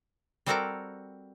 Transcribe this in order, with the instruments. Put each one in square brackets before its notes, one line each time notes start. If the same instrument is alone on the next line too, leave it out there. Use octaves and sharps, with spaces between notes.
[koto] G3 C4 F#4 A4 A#4 A#5